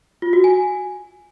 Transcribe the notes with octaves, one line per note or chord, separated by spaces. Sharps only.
F4
F#4
G#5